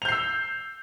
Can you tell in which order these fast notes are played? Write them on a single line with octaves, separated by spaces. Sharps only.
F7 G6 C7 E6